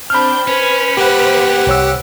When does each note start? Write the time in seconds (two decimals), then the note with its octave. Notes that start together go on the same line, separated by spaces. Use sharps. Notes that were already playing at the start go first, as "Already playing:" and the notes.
0.10 C4 D4 B5 F6 G6
0.48 C#4 B4 C5 B6
0.97 G3 A#3 G4 F#5
1.67 C2 C#5 E6